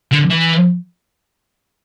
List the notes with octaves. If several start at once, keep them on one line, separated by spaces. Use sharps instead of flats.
D3
E3